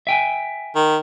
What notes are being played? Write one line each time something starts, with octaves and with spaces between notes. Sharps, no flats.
E5 G5 G#5
D#3